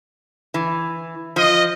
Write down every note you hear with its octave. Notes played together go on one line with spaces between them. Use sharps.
E3
F3 D#5